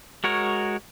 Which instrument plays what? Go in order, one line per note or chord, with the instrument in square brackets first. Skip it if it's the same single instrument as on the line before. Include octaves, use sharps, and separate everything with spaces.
[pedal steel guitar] G#3 F#4 A#4 C#5